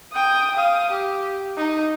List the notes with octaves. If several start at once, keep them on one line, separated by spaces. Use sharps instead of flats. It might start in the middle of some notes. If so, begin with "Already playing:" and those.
G5 D#6
F5 D#6
G4
D#4